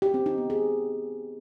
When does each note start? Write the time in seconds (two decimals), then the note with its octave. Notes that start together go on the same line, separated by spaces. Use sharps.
0.02 G4
0.14 C4
0.26 D#4
0.38 B3
0.50 G#4